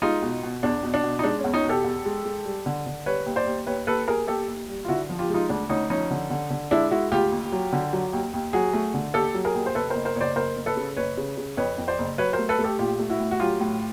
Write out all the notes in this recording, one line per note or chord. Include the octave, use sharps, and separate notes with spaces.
G#3 D#4 F4
B2
B2
E2 D4
B2
D4
B2
D#4
G#3 D4
C#4
E2
C#4 D#4
B2
G4 A4
E2
G#3
G#3
G3
D3
D3
G3 B4 C#5
D#2
C5 D5
D#2
D#2 B4 C#5
D#2 A4 B4
D#2 G#4 A#4
D#2 G4 A4
D#2
G3
F4
D3 E4 F#4
F3
F4 G4
G#3
D#4 F4
D2 D4
D2 C#4 D#4
F3 C#4 D#4
D3
D3
D3
G#3 D4 E4
G#3 E4 F#4
D2 F4 G4
D#2
F#3
D3
F#3
D#2
D#2
F#3 F#4 G#4
A3
D3
D#2 G4 A4
F#3
G#4 A#4
D#2
C5
F#1 A4 B4
F#1 A#4 C5
A#4 C5
F#1 C#5
C5 D5
F#1 A#4 C5
F#1
A4 B4
C#3
F#1 B4 C#5
C#3
C#3
F2 B4 C#5
F2
C5 D5
F#1
F#3 B4 C#5
A#4 C5
A3
A4 B4
A3
G4 A4
A#1 F4 G4
A3
E4 F#4
A2
F#4
F#3 F4 G4
A2